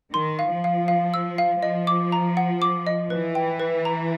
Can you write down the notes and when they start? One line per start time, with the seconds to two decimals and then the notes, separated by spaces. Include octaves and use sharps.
0.14 D#3 C6
0.39 F5
0.51 F3
0.64 F5
0.88 F5
1.14 E6
1.38 F5
1.62 F3 D#5
1.87 D6
2.12 A#5
2.37 F#5
2.62 D6
2.87 D#5
3.10 E3 B4
3.35 G5
3.60 B4
3.85 A#5